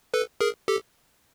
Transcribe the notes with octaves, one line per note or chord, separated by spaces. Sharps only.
A4 B4
G#4 A#4
G4 A4